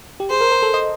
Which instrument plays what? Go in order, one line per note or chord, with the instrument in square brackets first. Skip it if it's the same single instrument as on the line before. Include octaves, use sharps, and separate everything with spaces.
[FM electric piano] G4
[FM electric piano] G#4 [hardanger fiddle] C5
[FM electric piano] A#4
A#4
A4
D#5